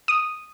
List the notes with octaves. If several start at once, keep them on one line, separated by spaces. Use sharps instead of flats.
D#6